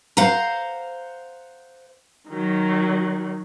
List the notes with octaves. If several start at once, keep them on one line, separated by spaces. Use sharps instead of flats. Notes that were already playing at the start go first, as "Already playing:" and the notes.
C5 F5 F#5 A#5
D#3 F#3